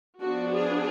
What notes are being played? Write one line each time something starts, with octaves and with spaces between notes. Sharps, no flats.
F3 B3 D4 F#4
G#4